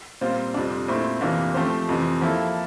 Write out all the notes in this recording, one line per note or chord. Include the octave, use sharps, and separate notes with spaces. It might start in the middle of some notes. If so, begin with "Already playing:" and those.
A#2 G3 C4 F4 C5
F2 C3 G3 D4
A#2 A3 C4 E4
F2 C3 E3 A#3 D4
F3 A3 C4 G4 C5
F2 C3 E3
F3 A#3 E4 A4